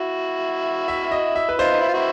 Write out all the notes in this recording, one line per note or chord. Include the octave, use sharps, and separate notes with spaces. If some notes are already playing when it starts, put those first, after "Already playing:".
Already playing: E4 F#4
E5
D#5
E5
B4
D#4 F4 C5
D#4
E4
F4
E4 F#4